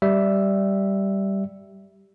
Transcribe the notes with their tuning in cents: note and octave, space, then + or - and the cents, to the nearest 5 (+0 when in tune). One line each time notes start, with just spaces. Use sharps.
G3 -5 E5 +0